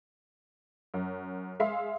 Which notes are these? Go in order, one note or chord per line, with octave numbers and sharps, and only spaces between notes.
F#2
G#3 E5 F5 C6